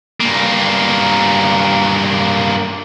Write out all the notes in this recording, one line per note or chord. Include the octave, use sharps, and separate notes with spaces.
G2 A#3